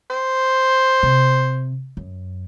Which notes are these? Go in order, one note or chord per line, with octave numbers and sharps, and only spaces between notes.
C5
C3
F#2